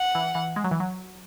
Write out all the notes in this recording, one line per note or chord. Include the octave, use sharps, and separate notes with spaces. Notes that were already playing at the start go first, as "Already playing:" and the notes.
Already playing: F#5
E3
E3
G#3
F#3
E3
F#3